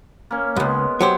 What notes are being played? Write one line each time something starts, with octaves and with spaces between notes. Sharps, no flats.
A#3 C#4
C#2 F#2 G#3 B3
F#3 G4 C5